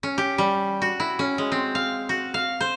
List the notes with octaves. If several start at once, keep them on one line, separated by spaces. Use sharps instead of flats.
C#4
G4
G3
F#4
E4
C#4
G#3
C4
F5
F#4
F5
C5